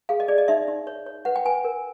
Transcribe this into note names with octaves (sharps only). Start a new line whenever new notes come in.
G#4 F5
D#5
G#4 D5
D#5
D#4 E5
D#4
C#5
C#5
B4 F#5
G5
B4 G#5
A#4